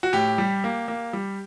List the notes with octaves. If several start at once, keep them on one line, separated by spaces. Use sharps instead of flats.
F#4
A2 G4
G3
A#3
A#3
G3